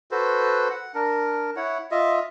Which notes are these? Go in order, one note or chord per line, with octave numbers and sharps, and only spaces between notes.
F#4 A4 B4 C5
F#5
D4 A#4
E4 C#5 F#5
F4 D#5 E5